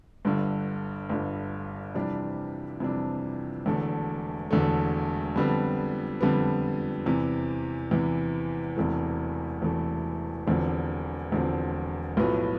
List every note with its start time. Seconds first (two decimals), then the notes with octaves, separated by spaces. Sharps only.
0.25 G1 G2 D3
1.09 G1 G2 D3
1.95 F2 C3 E3 G3 D4
2.80 F2 C3 E3 G3 D4
3.66 E1 E2 D3 A3
4.51 E1 E2 D3 A3
5.36 F2 D3 G3 B3
6.21 F2 D3 G3 B3
7.06 E2 C3 E3
7.91 E2 C3 E3
8.76 E1 E2 C3 E3 A3
9.61 E1 E2 C3 E3 A3
10.47 E1 E2 D3 F3 C4
11.31 E1 E2 D3 F3 C4
12.17 B1 A2 F3 B3